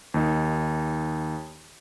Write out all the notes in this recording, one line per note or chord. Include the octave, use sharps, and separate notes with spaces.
D#2 D#4